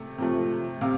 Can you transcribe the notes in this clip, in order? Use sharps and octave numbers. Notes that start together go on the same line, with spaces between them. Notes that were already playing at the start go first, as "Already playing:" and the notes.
Already playing: C3 A3
C3 F3 A3
C3 F5